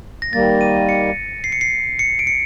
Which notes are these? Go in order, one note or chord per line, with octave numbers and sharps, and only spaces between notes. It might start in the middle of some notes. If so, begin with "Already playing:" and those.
A#6
D#3 G3 A#3 A6
D#7
C#7
C7
C#7
C7
C#7
D7
C#7